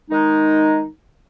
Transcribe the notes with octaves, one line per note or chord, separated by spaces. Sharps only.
D#3 G#3 D#4